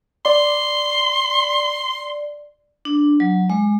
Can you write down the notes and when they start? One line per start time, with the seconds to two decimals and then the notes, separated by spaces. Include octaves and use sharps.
0.26 D5 C6
2.85 D4
3.20 F#3
3.50 G#3